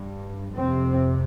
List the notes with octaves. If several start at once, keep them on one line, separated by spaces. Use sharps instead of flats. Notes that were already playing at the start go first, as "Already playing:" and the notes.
Already playing: G2
F2 C3 C4